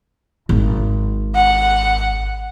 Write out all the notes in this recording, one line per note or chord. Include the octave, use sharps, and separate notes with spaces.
G#1
F#5